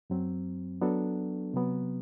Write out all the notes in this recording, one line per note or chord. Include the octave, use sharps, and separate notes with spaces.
F#2 F#3 C4
F#3 B3 D4 F#4 A4
C3 F#3 B3